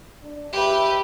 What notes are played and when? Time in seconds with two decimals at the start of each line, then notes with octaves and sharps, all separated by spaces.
0.22 D4
0.53 C#2 G4 B4 E5